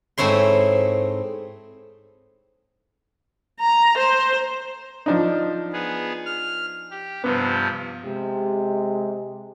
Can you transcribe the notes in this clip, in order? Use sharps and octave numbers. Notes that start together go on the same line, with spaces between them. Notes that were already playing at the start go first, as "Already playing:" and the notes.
G#2 A3 C4 E4 C#5 C6
A#5
C5
F3 D4 D#4
B3 G#4
F6
G4
G2 C3 F3 B3
C3 G#3 G4